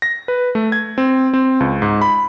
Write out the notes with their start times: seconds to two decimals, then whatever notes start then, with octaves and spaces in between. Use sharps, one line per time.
0.02 A#6
0.28 B4
0.55 A3
0.72 G#6
0.98 C4
1.34 C4
1.60 C#2
1.82 G#2
2.01 B5